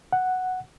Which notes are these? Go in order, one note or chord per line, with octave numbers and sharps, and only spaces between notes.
F#5